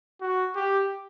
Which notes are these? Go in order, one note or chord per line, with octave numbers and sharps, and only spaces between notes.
F#4
G4